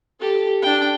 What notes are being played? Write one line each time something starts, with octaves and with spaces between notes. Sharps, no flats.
G4 A4
D4 G5